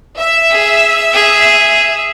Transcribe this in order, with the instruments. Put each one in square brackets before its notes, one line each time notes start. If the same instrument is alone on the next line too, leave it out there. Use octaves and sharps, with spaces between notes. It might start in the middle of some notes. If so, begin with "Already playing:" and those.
[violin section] E5
[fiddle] G#4
G#4